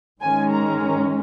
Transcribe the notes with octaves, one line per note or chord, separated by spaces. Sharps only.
G#2 D#3 G#3 C#4 G#5
A#5